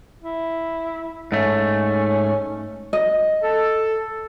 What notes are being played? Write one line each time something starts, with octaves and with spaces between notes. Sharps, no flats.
E4
G#2 A3 C#4
D#5
A4